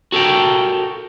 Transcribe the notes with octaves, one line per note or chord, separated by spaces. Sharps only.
F#4 A4 A#4 G5